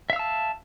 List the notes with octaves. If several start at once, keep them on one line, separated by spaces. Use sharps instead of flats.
E5 F5 A5 E6